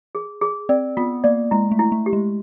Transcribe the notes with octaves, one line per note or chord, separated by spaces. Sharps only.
G#4
G#4
C4 D5
B3 F4
A#3 D5
G#3 E4
A3
E4
A3
G4
G#3